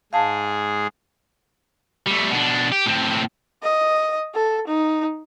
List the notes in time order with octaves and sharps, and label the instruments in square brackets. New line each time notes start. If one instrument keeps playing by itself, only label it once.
[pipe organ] G#2 G#4 [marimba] F5 A5
[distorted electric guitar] G3 A3
B2 D4
G4
A2 C4
[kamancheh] D#5
A4
D#4